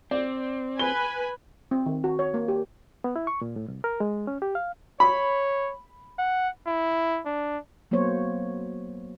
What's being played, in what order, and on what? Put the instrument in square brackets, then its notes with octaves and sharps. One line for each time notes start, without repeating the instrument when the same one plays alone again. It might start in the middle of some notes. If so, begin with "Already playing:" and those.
[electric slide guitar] C4 [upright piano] D5
[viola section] B4 G#5 B5 [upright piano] G7
[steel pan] C4
D#3
F#4
C#5
A#3
G4
[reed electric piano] B3
E4
C#6
A#2
A2
C2
A#4
G#3
C#4
G4
F5
[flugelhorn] C#5 [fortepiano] B5
[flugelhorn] F#5
E4
D4
[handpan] F#3 A#3 B3 C5 C#5